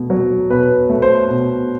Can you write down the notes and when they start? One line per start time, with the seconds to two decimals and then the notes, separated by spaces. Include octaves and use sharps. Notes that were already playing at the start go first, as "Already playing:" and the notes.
Already playing: B2 A3
0.10 F#3
0.50 B2 B4
0.90 A3
1.02 C5
1.29 B2